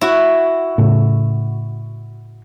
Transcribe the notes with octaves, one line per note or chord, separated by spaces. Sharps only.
E4 F#4
A2 C#3